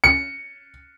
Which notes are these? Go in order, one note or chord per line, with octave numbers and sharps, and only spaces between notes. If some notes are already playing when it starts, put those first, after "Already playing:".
C#7